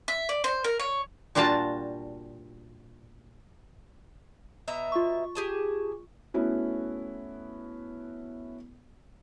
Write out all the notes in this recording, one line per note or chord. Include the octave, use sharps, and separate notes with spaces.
E5
D5
C5
A#4
C#5
A#2 G3 D4 F4 F#4 A5
B2 E5 A#5
F4 C#6
G4 G#4 A5
A3 B3 C#4 E4 F#4